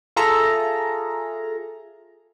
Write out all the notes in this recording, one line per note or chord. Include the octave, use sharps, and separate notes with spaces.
F4 G#4 A4 E5 A#5